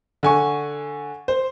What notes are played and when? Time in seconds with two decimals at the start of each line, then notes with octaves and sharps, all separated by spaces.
0.23 D3 G#5 C#6
1.28 C5